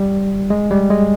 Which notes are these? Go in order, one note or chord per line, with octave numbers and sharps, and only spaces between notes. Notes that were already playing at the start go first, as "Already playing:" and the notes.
Already playing: G3
G#3
G3
G#3